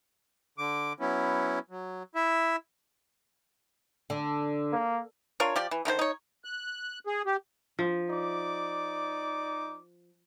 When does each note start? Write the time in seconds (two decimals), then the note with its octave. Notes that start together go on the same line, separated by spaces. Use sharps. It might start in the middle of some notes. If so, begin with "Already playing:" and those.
0.58 D3 D6
1.00 F#3 B3 C#4 E4
1.70 F#3
2.15 E4 E5
4.10 D3
4.72 A#3
5.40 D4 F4 A#4 C#5
5.56 F3 G4 D5
5.71 E3
5.85 D3 D#3 F4 C5
5.99 D#4 C#5
6.44 F#6
7.07 G#4
7.26 G4
7.79 F3
8.10 D#4 D5 D6